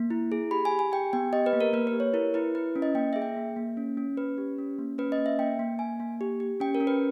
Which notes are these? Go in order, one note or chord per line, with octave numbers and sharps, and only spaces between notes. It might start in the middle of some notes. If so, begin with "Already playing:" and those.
Already playing: A#3
E4
G#4
G4 B5
G#5
G4
G#5
G4 G5
B3 G5
G4 D#5
B4
A#3
A#4
A#3 B4
B4
G4
C#5
E4 A#4
E4 B4
E4 B4
C#4
D#5
A#3 G5
G#4 E5
G5
A#3
A#3
C#4
C#4
C#4 B4
G4
C#4
A#3
C#4 B4
D#5
A#3
E5
A#3 G5
A#3
A#3 G#5
A#3
G4
G4
C#4 G5
A#4
C#4
B4